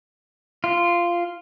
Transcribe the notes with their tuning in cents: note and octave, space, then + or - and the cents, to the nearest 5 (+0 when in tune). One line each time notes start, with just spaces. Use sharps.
F4 -10